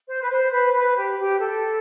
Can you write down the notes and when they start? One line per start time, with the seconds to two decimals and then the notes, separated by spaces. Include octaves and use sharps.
0.08 C5
0.22 B4
0.30 C5
0.52 B4
0.65 C5
0.74 B4
0.97 G4
1.19 G4
1.40 A4